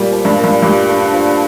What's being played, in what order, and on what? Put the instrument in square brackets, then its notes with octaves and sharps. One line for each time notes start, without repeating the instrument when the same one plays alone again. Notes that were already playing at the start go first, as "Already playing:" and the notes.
Already playing: [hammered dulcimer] A#2 [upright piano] G3
[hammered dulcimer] F3
[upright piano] G2
[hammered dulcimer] A#2
[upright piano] G2
[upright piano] G2 [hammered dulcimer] G4
[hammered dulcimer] D3
F3